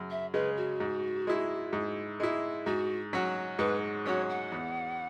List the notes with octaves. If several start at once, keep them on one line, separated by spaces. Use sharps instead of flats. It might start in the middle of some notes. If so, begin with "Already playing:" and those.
Already playing: F#2 C#3
E5
C#3 G#3 B4
F#4
G#2
G#3 E4
G#2
G#3 E4
G#2 F#4
F#3 C#4 F#4
G#2 B4
F#3 C#4 F#4 C#5
F#5
E2